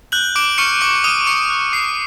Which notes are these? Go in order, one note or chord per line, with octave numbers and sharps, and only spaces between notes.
F#6 G6 F#7
D6 D7
C#6 F6 C#7
D6 D7
D#6 F6 D#7
C#6 C#7
F#6
C#6 C7